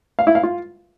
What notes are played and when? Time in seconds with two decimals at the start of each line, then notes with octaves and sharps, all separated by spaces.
0.19 F5
0.27 E4
0.35 F5
0.43 F4